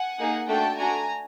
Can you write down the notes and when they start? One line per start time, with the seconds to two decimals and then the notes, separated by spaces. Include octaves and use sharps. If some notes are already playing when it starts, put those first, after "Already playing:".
Already playing: F#5 G#5
0.19 A#3 D#4 G#4
0.48 A3 D4 F#4 G5 A5
0.78 A3 D4 F#4 G#5 A#5